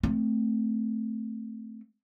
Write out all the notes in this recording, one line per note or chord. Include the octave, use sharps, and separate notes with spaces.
A3 C4